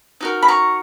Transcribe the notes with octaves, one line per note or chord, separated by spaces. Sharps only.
D#4 F#4 A#4
B5
A#5 C#6